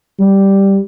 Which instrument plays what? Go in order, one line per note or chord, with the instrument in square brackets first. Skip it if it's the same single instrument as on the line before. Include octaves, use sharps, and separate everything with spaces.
[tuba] G3